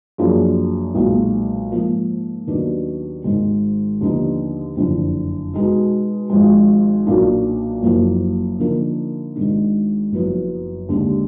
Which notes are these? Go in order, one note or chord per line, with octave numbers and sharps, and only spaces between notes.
F#2 F3 A#3 D4 G#4
B1 A#2 G#3
G#2 F3 A#3
D#2 D#3 F#3 B3 D4
G#1 G#2 D#3 G#3
D#2 D3 F3 B3 D#4
F#1 F2 D3
B2 G#3 D#4
G#1 G#2 F3 G#3
B1 A#2 F#3 A#3 D4
F#1 F#2 F3 A#3
D3 F3 A#3 D#4 A#4
G#1 G#2 D#3 G#3 D4
F#1 F#2 F3 B3
D#2 D3 G#3